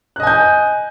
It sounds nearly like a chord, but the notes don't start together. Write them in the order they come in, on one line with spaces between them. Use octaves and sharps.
F#6 D#5 G#5 G6